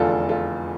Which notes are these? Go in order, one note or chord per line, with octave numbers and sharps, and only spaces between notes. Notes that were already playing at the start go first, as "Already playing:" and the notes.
Already playing: F1 E2 D3 F4 A4
F4 A4